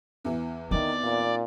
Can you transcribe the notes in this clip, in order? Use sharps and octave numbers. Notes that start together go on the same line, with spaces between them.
E2 E3
D#3 C4 D#4 D5 D6
A#2